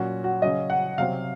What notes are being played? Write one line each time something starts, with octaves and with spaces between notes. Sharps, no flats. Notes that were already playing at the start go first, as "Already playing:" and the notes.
Already playing: A#2 F#3 C#4 F#4
F#4
C#3 F#3 C#4 D#5
F#5
C3 F#3 C4 F5